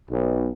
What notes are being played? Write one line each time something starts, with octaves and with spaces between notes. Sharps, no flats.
B1